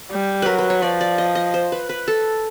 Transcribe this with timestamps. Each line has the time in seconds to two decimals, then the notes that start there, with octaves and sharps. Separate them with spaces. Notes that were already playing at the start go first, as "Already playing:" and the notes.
0.11 G3
0.42 F#3 A#4 B4
0.58 B4
0.70 C#5
0.82 F3 D5
1.01 D5
1.18 D#5
1.35 D#5
1.54 C5
1.72 B4
1.89 B4
2.08 A4